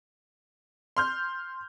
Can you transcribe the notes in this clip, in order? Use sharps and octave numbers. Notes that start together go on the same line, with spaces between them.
C6 F6 G6